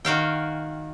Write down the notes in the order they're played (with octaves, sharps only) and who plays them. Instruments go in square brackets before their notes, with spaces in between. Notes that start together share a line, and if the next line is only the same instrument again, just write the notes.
[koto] D#3 F#4 F5 G5